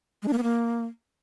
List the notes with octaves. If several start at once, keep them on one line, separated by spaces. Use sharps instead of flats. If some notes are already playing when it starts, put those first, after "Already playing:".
G#3
D4
A#3
B3
A#3